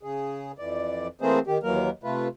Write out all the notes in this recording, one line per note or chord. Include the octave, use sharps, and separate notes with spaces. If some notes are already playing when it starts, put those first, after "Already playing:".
C#3 G#4
F2 E3 D5
E3 A3 A#3 C4 G#4 C5
D#3 G4
D#2 E3 F#3 A#3 A#4
C3 A3 F4 B4